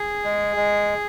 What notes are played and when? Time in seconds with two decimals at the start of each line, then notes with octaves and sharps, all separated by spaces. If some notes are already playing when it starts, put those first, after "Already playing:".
Already playing: G#4
0.24 G#3
0.57 G#3